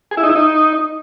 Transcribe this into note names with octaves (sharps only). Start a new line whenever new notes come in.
G#4
E4
D#4
E4
D#4